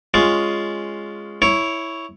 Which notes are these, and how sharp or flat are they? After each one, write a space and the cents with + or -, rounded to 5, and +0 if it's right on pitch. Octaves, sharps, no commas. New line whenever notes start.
G#3 +0 C#4 +0 F4 +0
E4 +0 C#5 +5